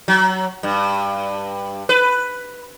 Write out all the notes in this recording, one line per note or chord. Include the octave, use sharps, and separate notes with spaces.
F#3
G2
B4